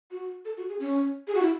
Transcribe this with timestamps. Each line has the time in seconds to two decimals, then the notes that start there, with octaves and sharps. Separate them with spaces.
0.11 F#4
0.45 A4
0.57 F#4
0.69 G#4
0.80 C#4
1.28 G#4
1.35 F#4
1.42 E4